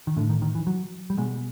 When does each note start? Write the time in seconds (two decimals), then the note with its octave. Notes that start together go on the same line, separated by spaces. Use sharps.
0.07 D#3
0.17 A2 D3
0.30 D#3
0.42 D#3
0.55 E3
0.67 F#3
1.10 G3
1.18 B2 G#3